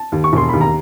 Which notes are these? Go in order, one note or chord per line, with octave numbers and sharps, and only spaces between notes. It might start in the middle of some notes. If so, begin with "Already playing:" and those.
Already playing: A5
D#2
C#6
E1 C6
D#2 B5
A#5